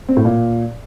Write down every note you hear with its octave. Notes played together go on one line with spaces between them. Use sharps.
C4
A2
A#2